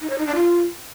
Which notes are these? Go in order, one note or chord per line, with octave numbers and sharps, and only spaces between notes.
D#4
C#5
D#4
D4
F4